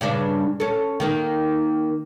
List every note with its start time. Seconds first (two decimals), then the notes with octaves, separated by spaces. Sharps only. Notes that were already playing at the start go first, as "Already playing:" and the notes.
0.01 G2 C#3 D4
0.60 C#4 A4
1.00 D#3 A#3 D#4